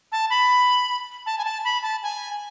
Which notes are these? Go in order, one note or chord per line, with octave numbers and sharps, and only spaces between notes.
A5
B5
A5
G#5
A5
B5
A5
G#5